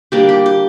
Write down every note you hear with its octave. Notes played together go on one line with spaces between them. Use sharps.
G3 A#3 D4 G4
G4
G4